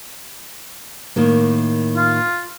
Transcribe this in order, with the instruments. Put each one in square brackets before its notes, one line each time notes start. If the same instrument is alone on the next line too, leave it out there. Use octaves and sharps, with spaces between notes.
[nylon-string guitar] A2 D#3 A#3
[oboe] F4